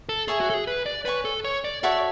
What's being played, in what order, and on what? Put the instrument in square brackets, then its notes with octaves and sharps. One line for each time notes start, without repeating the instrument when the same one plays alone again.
[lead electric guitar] A4
[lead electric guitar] G#4 [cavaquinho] C#5 E5 G#5
[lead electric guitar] F#4
A4
G#4
B4
D5
[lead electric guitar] B4 [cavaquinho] C#5 G#5 C#6
[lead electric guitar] A4
C#5
D5
[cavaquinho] F#4 A4 C#5 E5 [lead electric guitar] D5